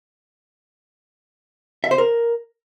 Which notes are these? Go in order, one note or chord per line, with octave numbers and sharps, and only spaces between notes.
E5
C5
A#4